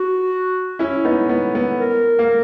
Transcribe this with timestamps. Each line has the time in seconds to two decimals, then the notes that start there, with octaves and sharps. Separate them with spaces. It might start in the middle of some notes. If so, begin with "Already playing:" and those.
Already playing: F#4
0.79 C#4 E4
1.05 B3 D#4
1.29 B3
1.55 B3
1.79 A#4
2.19 A#3